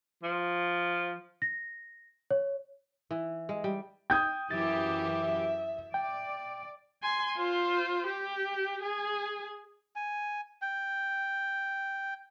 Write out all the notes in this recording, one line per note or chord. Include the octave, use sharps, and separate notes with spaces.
F3
A#6
C#5
E3
G#3
G3
G5 D#6 G6 G#6
F#2 E3 G4 E5 A6
D5 G5
G#5 C6
F4 C5
G4
G#4 G#5
G#5
G5